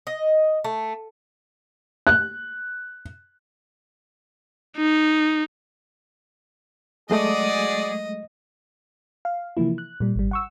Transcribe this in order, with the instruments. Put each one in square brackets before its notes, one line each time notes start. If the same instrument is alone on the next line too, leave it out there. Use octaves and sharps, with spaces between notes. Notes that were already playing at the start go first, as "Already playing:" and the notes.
[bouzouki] D#5
A3
[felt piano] F#6
[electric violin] D#4
[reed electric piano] F#3 G#3 A3 [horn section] F#4 G#4 D5 [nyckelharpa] D#5
[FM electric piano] F5
C3 E3 F3 A#3 E4
F#6
A#2 G3
G#1 G3
F#5 C#6 E6